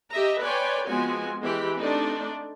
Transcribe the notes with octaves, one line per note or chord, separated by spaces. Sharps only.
G4 D#5 E5 A#5
B4 C#5 D5 G5 G#5 C6
F3 G#3 B3 C4 F#4 G#5
E3 G#3 G4 G5 B5
A3 C4 D4 D#4 D5